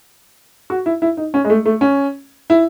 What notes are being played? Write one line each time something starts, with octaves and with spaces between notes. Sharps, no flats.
F#4
E4
E4
D#4
C#4
G#3
A3
A3
C#4
E4